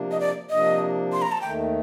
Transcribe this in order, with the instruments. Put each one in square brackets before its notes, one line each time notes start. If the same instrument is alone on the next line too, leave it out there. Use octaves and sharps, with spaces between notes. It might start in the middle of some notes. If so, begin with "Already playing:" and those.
Already playing: [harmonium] C3 F3 A#3 D4
[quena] D#5
D5
[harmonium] C3 F3 A#3 D4 [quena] D#5
[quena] C6
A#5
A5
[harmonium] D#2 D#3 A3 [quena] G5